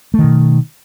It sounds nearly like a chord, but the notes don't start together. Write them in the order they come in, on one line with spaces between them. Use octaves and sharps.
A3 D#3 B2